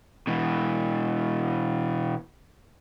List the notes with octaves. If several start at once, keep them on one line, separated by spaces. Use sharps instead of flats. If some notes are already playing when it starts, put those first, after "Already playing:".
B2 E3